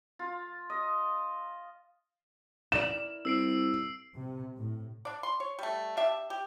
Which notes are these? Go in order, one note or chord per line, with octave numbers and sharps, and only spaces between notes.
F4
D#5
E4 A#4 D5 E7
C2 E6 C7 D7
C3
A2
D4 D5
C6
C#5
G3 A3
D4 G4 E5
G4